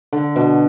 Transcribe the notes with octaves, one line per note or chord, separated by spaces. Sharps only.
D3
B2